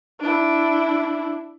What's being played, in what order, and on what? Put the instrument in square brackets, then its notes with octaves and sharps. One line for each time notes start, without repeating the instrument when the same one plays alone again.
[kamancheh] D4 E4